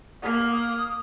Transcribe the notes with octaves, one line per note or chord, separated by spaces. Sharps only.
A#3
D#6